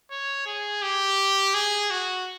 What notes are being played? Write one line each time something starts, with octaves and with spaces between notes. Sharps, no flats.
C#5
G#4
G4
G#4
F#4